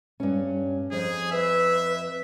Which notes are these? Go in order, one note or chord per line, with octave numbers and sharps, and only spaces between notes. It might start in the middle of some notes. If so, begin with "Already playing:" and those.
G2 C#4
F2 G#4 C5
B4 E5